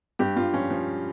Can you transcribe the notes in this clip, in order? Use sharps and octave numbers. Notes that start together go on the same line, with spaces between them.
G2 G4
G2 F4
F3 C#4
F3